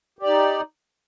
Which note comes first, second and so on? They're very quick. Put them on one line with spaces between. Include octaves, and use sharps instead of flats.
G4 D5 D#4